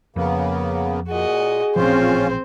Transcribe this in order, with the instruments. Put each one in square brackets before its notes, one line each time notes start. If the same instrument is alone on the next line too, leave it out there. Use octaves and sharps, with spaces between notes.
[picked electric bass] F2 [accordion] C#3 A#3 B3
[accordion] A#2 [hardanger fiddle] F#4 D#5 [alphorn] G#4
[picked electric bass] A1 A#2 F3 [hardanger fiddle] C4 C5 [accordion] C#4 F4